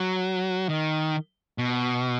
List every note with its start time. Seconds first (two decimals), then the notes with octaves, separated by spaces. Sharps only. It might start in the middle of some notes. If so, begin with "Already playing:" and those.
Already playing: F#3
0.69 D#3
1.58 B2